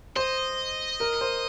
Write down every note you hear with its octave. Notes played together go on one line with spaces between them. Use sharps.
C5 D#5
A#4
C5